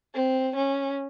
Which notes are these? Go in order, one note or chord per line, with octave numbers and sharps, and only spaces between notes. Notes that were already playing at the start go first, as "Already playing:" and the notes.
C4
C#4